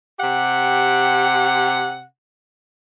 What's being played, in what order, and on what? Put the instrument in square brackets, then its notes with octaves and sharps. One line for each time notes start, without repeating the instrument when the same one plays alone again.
[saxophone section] C3 G4 F#5